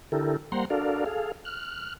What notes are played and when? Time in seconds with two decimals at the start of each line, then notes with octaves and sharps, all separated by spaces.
0.12 D3 E4 G4 A4 A#4
0.52 G3 A#3 C5 F#5 A#5 C6
0.70 D4 F#4 A4 A#4 D5 F5
1.06 G#4 A4 F5
1.45 F6 F#6